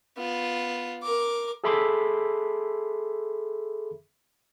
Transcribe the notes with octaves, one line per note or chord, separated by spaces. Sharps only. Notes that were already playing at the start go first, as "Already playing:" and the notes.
B3 F4
A#4 D6
G#4 A4 E5 B5 C6 D6